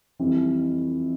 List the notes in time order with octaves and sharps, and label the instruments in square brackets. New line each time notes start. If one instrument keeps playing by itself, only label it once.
[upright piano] F2 E3 G3 C4